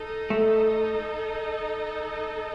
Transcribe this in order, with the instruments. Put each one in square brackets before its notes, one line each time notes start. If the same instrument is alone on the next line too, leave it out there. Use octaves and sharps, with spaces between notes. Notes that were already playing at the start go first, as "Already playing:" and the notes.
Already playing: [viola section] D#4 A4 D#5
[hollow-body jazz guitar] A3